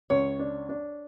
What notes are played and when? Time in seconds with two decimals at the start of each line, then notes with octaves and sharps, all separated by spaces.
0.10 C#2 C#5
0.39 D4
0.69 D4